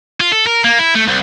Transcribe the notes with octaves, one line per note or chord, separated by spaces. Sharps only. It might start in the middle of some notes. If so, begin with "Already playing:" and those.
F4
A4
A#4
A#3
E4
A3
C2